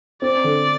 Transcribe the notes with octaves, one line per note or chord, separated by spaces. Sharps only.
C4 D5
D3